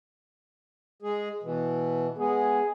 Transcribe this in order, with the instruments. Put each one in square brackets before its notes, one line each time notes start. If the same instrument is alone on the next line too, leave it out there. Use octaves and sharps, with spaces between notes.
[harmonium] G#3 G#4
B2 E3
[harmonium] G#3 B3 [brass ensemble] G#4